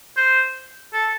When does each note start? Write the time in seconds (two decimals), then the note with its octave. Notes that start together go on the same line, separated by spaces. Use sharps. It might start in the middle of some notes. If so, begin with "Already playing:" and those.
0.17 C5
0.93 A4